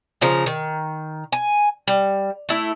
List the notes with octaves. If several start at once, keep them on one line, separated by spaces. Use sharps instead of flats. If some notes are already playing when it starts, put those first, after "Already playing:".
C#3 F3 A#4
D#3
G#5
G3
A3 E4